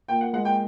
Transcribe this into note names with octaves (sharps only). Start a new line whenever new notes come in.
A#2 G5
F#5
G#3 F#5
G5